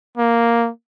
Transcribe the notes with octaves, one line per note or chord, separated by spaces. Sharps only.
A#3